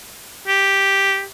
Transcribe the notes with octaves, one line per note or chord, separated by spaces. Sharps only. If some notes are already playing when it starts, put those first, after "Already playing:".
G4